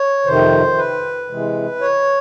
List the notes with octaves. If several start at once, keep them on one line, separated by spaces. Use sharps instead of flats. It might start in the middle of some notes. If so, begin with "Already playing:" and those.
Already playing: C#5
F2 C3 D#3 C5
B4
C3 E3 G#3
C#5